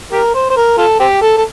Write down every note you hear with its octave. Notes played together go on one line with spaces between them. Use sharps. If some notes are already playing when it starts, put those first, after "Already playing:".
G4 A#4
C5
C5
A#4
F4 A4
C4 G4
A4
A4